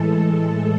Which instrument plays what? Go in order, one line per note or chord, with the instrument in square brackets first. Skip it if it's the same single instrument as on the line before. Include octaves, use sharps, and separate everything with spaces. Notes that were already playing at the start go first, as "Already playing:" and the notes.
Already playing: [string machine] A2 E3 G#3 A4